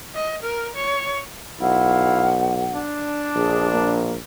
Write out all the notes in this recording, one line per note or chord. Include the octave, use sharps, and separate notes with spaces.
D#5
A#4
C#5
B1 E4 F5 F#5
D4
A#1 G#4
A#3